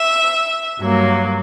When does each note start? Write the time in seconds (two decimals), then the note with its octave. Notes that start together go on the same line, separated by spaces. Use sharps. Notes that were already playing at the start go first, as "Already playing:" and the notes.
Already playing: E5
0.79 G2 F#3 A#3